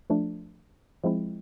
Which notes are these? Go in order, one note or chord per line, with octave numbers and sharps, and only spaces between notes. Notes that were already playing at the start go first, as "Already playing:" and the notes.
F3 A3 D4
F3 G#3 C4 E4